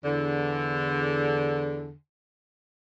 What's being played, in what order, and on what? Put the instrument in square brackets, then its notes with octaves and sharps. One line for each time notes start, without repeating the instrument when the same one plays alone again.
[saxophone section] E2 D3